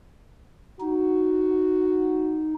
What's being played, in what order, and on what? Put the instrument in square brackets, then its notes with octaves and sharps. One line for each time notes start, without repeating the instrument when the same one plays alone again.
[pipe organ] D#4 [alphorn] F#4